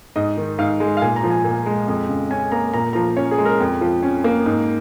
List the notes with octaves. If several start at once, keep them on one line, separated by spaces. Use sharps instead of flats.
G#2 D#5
D#3
G#2 F5
G#3
F5
A#2 G#5
A#5
F3
G#5
A#2
G#3
F2
C#3
C#4 G#5
A#3 A#5
A#2 A#5
F3 A#5
C#4 C#5
G#4
G#3
A#4
F2
F3
C#4
A#3
G#2